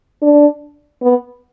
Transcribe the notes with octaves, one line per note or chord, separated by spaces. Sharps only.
D4
B3